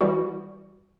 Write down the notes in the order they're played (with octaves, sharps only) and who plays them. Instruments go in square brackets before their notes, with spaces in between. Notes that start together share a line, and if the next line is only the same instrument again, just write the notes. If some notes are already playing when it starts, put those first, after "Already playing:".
[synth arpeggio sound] E3 G3 F#4